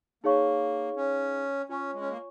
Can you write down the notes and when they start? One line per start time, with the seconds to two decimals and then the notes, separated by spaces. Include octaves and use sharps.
0.24 A#3 D#4 G#4 C#5 F5 C#6
0.97 C#4
1.69 C#4 F4 C#5 G#5 C#6
1.93 G#3
2.01 C#4
2.09 A#3